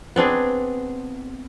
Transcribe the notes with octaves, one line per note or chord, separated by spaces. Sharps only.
B3 C4 D4 G#4